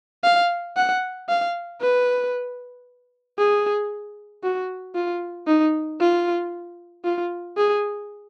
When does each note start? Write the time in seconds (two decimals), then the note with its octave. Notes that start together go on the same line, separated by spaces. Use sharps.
0.24 F5
0.76 F#5
1.29 F5
1.81 B4
3.38 G#4
4.43 F#4
4.95 F4
5.47 D#4
6.00 F4
7.05 F4
7.57 G#4